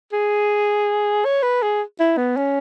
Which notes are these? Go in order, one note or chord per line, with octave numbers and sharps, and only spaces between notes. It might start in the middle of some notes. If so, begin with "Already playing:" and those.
G#4
C#5
B4
G#4
E4
B3
C#4